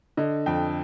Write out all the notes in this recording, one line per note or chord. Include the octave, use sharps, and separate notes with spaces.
D3 D#5
F2 G5